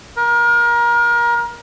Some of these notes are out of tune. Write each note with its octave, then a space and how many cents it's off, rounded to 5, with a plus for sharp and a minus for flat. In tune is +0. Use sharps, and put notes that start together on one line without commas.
A#4 +30